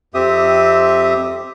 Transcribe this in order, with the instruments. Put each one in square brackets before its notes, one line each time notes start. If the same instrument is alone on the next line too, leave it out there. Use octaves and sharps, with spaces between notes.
[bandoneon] F2 C4 G4 E5 D#6